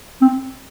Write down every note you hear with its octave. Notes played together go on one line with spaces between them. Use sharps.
C4